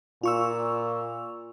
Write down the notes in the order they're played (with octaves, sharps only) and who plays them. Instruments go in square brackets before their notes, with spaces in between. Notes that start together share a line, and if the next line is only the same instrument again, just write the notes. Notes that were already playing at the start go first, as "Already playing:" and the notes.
[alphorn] A#2 [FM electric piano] F4 C#6 E6